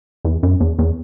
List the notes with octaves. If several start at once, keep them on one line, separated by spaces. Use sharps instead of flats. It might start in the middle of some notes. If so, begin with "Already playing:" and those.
E2
F#2
E2
E2